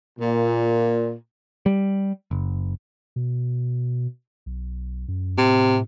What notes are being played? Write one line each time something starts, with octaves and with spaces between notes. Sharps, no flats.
A#2
G3
F#1
B2
B1
F#2
A2 C3